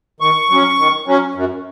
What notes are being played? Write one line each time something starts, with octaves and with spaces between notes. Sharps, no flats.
D#3 C#6
F#3 C#4
D#3
F#3 C#4
F#2